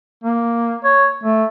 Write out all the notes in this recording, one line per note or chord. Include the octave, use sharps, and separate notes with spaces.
A#3
C#5
A3